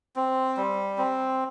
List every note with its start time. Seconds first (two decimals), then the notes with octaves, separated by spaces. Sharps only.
0.16 C4
0.57 G3
0.98 C4